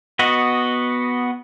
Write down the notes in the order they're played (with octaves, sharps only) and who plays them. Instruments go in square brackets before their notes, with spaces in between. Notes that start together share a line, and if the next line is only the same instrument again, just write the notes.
[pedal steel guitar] B3 F#4 D#5